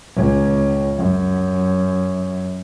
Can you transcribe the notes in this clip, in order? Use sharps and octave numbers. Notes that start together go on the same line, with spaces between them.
C#2
F#2